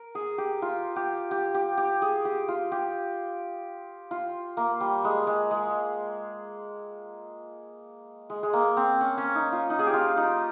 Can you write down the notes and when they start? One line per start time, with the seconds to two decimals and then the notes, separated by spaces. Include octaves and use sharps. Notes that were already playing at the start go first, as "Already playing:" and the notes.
Already playing: A#4
0.15 G#4
0.38 G4
0.62 F4
0.96 G4
1.31 G4
1.55 G4
1.77 G4
2.02 G#4
2.25 G4
2.48 F4
2.72 G4
4.11 F4
4.57 A#3
4.80 G3
5.04 G#3
5.27 G#3
5.51 G#3
8.30 G#3
8.43 G#3
8.53 A#3
8.77 C4
9.01 C#4
9.18 C#4
9.35 D#4
9.52 F4
9.70 D#4
9.79 G#4
9.87 G4
9.94 F4
10.17 D#4